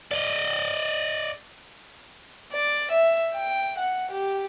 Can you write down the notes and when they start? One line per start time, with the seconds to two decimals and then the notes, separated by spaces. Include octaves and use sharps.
0.11 D5 D#5
2.52 D5
2.91 E5
3.34 G5
3.77 F#5
4.11 G4